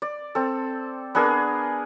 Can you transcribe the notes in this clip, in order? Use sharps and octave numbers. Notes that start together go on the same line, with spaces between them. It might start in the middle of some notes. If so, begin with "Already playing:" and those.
D5
C4 A4
B3 D4 G#4 A#4